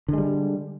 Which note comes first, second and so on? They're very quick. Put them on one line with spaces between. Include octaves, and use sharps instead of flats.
D3 G#3 G3